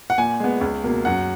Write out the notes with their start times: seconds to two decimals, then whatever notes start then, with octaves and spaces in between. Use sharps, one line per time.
0.10 F#5
0.18 A#2 G#5
0.40 G#3 B3
0.61 C#2
0.84 B2 A#3
1.05 F#2 F#5